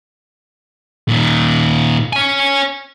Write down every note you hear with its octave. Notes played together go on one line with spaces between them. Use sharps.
A#2 D#3
C#5 G#5